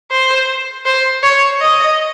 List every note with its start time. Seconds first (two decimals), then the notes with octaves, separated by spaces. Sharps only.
0.11 C5
0.86 C5
1.23 C#5
1.61 D#5